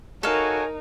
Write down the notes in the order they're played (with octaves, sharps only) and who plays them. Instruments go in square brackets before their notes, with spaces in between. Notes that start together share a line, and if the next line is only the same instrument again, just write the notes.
[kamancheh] D#4 [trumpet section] F#4 C#5 G#5 [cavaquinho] A4 F5 [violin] A#4